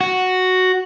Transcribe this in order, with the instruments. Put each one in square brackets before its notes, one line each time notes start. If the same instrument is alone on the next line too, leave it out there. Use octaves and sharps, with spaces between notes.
[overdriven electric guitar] F#4